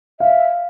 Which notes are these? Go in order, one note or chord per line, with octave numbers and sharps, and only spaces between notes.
E5 F5